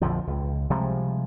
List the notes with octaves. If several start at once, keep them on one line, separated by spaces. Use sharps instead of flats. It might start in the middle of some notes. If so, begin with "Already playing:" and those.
A#1 F2 D3 F3
C#2
C3 F3 G3 G#3